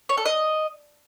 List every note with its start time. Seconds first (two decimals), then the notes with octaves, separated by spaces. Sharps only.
0.09 C#5
0.17 A4
0.25 D#5